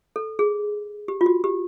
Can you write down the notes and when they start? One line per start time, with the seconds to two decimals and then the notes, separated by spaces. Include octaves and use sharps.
0.16 A4
0.39 G#4
1.08 G4
1.21 F4
1.26 F#4
1.44 G4